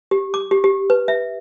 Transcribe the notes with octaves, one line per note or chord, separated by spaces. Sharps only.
G4
D6
G4
G4
B4
E5